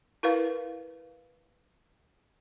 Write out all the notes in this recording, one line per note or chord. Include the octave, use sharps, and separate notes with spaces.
E4 A#4 B4 F5